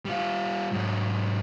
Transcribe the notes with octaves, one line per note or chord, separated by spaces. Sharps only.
G3 F4
G#2 F#3